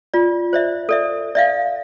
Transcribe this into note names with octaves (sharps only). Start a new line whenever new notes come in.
F4 D5
C5 D5 E5
A4 D5 E5
D5 E5 F5